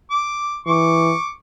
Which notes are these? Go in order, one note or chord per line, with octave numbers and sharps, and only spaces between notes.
D6
E3 C#6 D6